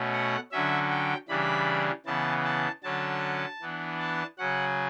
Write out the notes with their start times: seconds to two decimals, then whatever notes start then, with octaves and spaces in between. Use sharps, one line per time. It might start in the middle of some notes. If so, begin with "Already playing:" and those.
Already playing: B2 A3 C#4
0.13 F#5
0.52 D3 F#3 C#4 E5
0.91 G5
1.28 C#3 E3 G3 D4 B5
2.06 C#3 E3 B3 A5
2.45 A5
2.83 D3 F#3 C#4 A5
3.61 E3 B3 D4
3.99 A5
4.38 C#3 F#3 C#4 F#5